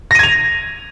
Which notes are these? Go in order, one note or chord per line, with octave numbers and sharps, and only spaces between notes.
G#6 A#6 D#7 F7